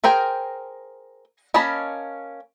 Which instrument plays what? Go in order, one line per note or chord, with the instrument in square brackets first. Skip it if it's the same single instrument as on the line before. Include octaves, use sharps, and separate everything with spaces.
[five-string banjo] G#4 A#4 C5 G5
A#3 C#4 D#5 A5 B5